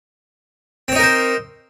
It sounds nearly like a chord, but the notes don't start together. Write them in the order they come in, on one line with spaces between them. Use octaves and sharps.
C4 C#5 D#4 A#4 C5